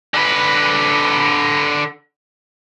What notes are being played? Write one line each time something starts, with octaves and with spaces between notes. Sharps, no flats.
D3 B4